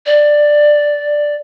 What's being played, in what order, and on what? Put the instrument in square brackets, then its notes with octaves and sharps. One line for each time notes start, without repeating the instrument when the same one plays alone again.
[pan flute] D5